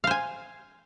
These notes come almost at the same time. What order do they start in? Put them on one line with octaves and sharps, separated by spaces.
F5 C5 G#5